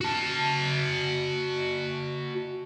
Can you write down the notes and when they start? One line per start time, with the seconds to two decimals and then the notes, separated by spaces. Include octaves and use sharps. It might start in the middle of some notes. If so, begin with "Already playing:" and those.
0.01 F#4 A5